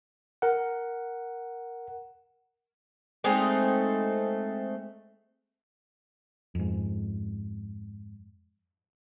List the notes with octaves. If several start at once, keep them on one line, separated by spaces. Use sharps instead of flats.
A#4 F#5
G#3 A3 C4 D#4
F2 G#2